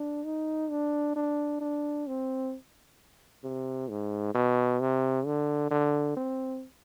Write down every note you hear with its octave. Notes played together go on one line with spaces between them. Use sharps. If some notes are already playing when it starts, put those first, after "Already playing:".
Already playing: D4
D#4
D4
D4
D4
C4
C3
G#2
B2
C3
D3
D3
C4